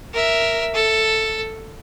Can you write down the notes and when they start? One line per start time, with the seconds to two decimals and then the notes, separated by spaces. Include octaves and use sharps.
0.13 A#4 E5
0.74 A4